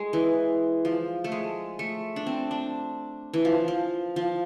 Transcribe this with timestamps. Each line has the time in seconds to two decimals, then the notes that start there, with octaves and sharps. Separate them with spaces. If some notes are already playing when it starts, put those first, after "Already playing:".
Already playing: G#3
0.13 E3
0.85 F3
1.24 A3
1.32 G#3
1.79 A3
2.16 D4
2.26 C4
2.51 D4
3.33 E3
3.45 F3
3.68 F3
4.16 F3